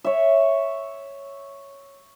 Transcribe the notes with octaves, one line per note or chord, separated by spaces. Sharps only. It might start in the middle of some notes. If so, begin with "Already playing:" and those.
C#5 E5